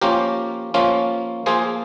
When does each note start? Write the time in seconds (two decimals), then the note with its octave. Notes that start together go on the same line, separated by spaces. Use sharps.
0.01 F3 A#3 C#4 F4 G4 A#4
0.74 F3 A#3 C#4 F4
1.46 F3 A#3 F4 G#4 C5